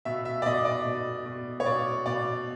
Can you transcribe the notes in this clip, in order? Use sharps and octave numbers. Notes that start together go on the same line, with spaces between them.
B2 E5
E5
D5
B2 D#5
D5
B2
B2
C#5
B2 D5
B2 D5